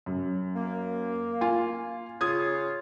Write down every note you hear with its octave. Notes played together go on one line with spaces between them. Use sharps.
F#2
A#3
F4 G#5
C#3 F4 D#6 G#6